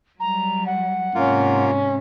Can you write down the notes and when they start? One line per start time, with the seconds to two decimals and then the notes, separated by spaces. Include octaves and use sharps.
0.20 F#3 G3 A#5
0.66 F#5
1.15 G#2 C3 A#3 C#4 F4